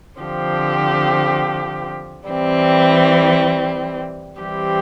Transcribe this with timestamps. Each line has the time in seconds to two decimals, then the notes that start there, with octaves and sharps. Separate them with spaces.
0.18 D3 F3 C4 G4
2.29 E3 G3 C4
4.39 E3 G3 C4 G4